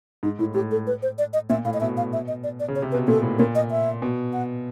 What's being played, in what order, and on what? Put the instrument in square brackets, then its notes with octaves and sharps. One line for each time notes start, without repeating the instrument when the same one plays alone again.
[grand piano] G#2 [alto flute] D#4
[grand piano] A2 [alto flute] E4
[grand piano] A2 [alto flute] G4
[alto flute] A4
B4
C5
D5
D#5
[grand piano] A#2 [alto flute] E5
[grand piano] A2 [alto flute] F5
[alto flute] D#5
[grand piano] B2 [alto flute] E5
[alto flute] F5
E5
D#5
D5
D5
[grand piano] C#3
[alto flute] C#5
[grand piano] C3
[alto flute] B4
[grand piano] B2
[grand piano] A#2 [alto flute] A4
[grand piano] A2
[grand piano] A#2 [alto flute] A#4
[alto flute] D#5
E5
[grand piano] B2
[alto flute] F#5